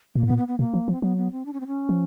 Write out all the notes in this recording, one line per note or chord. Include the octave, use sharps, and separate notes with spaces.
A#2 A#3
A2
B3
A#2
B3
B3
B2 A#3
F3
F3
C4
F#3 B3
B3
C4
D4
C#4
C4
C#4
F3